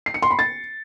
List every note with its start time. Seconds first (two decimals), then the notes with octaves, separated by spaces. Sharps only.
0.06 C7
0.14 C#7
0.22 C6
0.31 B5
0.39 A6